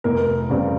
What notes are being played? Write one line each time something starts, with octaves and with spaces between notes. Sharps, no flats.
F1 A#4
E2 C#3 G3 C4